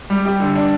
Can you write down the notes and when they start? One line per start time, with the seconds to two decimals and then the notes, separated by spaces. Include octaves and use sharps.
0.10 G3
0.25 G4
0.40 D3
0.55 D4